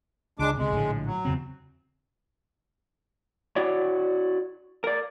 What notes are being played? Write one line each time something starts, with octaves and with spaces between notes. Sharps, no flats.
C#2 G#3 D4 D6
C#2 C3 G#3
A#1 A2 D3
F#3
E2 C#3 C4
E4 F#4 C#5 D5
A#4 D5